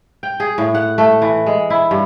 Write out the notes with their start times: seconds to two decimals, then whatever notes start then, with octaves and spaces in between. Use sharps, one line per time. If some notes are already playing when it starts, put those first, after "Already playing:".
0.23 G5
0.40 G#4
0.58 A2
0.75 F#5
0.98 A3
1.22 E3
1.46 G#3
1.70 E4
1.91 G2